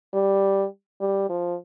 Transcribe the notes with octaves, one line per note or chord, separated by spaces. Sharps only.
G3
G3
F3